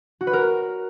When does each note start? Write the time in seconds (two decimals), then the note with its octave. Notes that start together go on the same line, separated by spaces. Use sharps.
0.21 F#4
0.27 B4
0.33 A#4